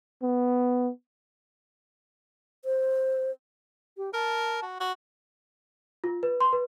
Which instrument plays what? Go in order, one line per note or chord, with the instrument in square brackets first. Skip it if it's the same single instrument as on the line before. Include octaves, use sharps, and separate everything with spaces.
[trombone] B3
[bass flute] C5
[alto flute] G4
[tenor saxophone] A#4 [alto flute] A5
[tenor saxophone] F#4
F#4
[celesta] F4
B4
C6
B4